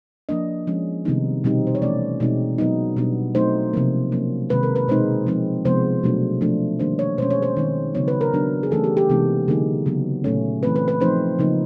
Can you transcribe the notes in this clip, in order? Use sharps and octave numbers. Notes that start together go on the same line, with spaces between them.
F3 A#3 D4 D#5
F3 G#3 C#4
C3 D#3 G3 B3 D#4
B2 G3 C4 D#4
C5
C#5
E3 A3 C#4 D5
B2 G#3 C4 D#4
F#3 B3 D#4
B2 G3 B3 D4
F#3 A3 C4 D#4 C5
C3 F3 A#3
F#3 A#3 C#4
C3 D#3 G#3 B4
A#4
B4
B2 G#3 C4 D#4 C5
F3 G#3 C4 D#4
C3 F3 G#3 B3 C5
B2 F#3 A3 D4
F3 A3 D4
D#3 G3 A#3 D4 C5
C#5
B2 G#3 C#4 C5
C#5
C5
D#3 G#3 C4 D#4
C#3 F#3 B3 D#4 C#5
B4
A#4
C#3 F#3 B3 D4
G#4
E3 A3 C#4 A4
G4
G4
C3 E3 G#3 B3 D#4
D3 F#3 A#3 D#4 G#4
C#3 F#3 B3
A#2 F#3 A3 C#4
E3 A3 C4 B4
B4
B4
F3 A3 C4 D#4 C5
C#3 F3 A#3 D#4